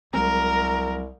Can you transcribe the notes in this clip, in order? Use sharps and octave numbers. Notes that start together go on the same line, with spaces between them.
C2 F#3 G#3 C4 A#4 A#5